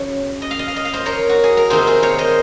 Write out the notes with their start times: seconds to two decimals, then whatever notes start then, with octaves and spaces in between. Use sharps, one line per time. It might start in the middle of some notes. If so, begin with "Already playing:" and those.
Already playing: C#3 F#3 C#4 C#5
0.42 D#5
0.51 F5
0.59 D#5
0.68 F5
0.76 D#5
0.85 F5
0.94 C5 D#5
1.06 A#4 C#5
1.30 F#4
1.44 G#4
1.57 A#4
1.70 C3 D#3 A#3 D#4 G#4 C5
1.87 G#4 C5
2.03 A#4 C#5
2.18 C5 D#5